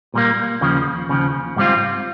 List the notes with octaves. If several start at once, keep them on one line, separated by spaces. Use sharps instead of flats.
A#2 G3 A#3
D#2 C#3 F3
D#2 C#3 F3
G#2 G3 C4 F4